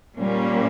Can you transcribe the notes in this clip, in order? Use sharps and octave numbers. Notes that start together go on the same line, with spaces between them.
A#2 G3 A#3 C#4